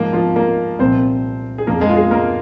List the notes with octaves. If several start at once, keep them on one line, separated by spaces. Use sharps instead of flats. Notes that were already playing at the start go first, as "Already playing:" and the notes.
Already playing: G#2 F3 A#3
F3 F4
A#3 A#4
C2 A#2 F3 C4 C5
G#4
F2 F3 A#3 A#4
G#3 G#4
F4
G#3 G#4
A#3 A#4